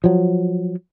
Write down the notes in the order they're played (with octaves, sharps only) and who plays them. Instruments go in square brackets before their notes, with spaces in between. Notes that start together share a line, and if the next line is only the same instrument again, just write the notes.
[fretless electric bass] F3 F#3